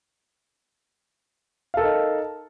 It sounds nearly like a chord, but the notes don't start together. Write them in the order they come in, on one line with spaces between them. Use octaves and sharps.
F5 A4 A#4 D#4